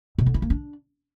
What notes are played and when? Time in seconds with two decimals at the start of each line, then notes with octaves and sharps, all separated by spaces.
0.18 B2
0.26 D3
0.34 E4
0.42 A#3
0.50 D4